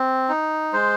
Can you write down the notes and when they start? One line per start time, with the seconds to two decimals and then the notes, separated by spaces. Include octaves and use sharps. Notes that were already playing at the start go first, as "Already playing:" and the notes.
Already playing: C4
0.29 D#4
0.73 G#3 C5